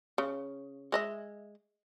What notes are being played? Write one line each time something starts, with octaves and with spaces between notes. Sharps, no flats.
C#3
G#3 D#5 E5